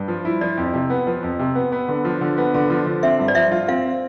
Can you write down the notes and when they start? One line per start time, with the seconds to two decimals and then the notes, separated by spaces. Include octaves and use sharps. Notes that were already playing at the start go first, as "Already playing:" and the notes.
Already playing: G2
0.08 F3
0.25 E4
0.41 F3 D5
0.57 F2
0.74 C3
0.90 B3
1.07 F3
1.23 F2
1.39 C3
1.55 B3
1.72 B3
1.88 D3
2.05 F3
2.21 D3
2.37 B3
2.54 D3
2.70 F3
2.86 D3
3.03 C4 E5
3.19 G2
3.28 D5
3.35 F3 E5
3.52 F4
3.68 C4 F5